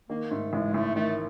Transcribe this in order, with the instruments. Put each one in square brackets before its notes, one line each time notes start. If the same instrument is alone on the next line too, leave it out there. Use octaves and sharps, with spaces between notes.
[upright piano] D#3 [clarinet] A#3
[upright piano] G#2 [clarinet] A3
[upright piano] A1 [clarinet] G#3
[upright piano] A1 [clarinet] A3
[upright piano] D#3 [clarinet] A3